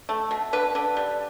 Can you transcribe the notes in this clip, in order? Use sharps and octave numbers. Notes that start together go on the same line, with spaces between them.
A3
B2
D3 B4
D3
G3